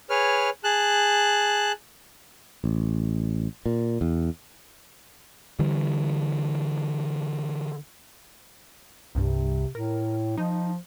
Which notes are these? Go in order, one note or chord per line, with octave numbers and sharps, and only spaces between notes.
G#4 B4 C#5 F6
G#4 A5 F#6
A1
A#2
E2
D3 E3 G3
C2 G2 C3
A2 A#4
F3 D#4